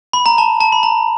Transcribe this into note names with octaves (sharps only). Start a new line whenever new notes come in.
B5
A#5
A5
A5
B5
A#5